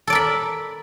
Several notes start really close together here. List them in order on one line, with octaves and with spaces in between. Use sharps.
A4 D5 A#4 B5